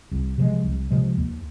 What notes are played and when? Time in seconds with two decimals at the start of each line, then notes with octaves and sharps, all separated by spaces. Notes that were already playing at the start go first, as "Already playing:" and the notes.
0.11 C2
0.38 C3 F3 G#3
0.64 C2
0.91 C3 F3 G#3
1.17 D#2